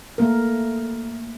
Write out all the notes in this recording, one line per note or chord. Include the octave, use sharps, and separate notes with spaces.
A3 A#3 A#4